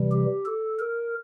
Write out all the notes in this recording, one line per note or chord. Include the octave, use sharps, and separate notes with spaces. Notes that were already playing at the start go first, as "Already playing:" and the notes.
Already playing: C3 E3 G3
G4
A4
A#4